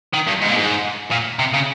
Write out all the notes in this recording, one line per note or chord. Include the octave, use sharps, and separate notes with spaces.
D#3
G2
G#2
A#2
G#2
A#2
C3
C#3